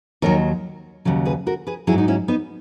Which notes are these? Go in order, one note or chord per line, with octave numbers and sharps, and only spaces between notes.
D#2 D#3 F#3 A#4 C#5
D#2 C#3 F#3
G#4 B4
F#4 A#4
G#4 B4
F#3 E4 G#4
G#2
D#4
C#4 E4
B3 D#4